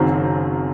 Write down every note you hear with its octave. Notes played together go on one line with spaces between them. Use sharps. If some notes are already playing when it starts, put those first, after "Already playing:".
Already playing: F#1 F#2 D#3 F#3 C4